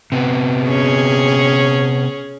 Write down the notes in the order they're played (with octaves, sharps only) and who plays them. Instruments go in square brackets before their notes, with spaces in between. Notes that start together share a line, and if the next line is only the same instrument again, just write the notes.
[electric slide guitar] C3 B3
[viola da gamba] C#4 G#4